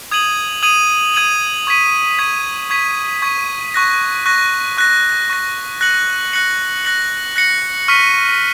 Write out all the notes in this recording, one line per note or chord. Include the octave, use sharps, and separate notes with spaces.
D#6 G#6 D#7 F#7
D#6 G#6 D#7 F#7
D#6 G#6 D#7 F#7
C#6 G#6 B6 D#7
C#6 G#6 B6 D#7
C#6 G#6 B6 D#7
C#6 G#6 B6 D#7
C#6 F#6 A#6
C#6 F#6 A#6
C#6 F#6 A#6
C#6 F#6 A#6
F#6 A#6 C#7 F#7
F#6 A#6 C#7 F#7
F#6 A#6 C#7 F#7
F#6 A#6 C#7 F#7
C#6 F6 B6 D#7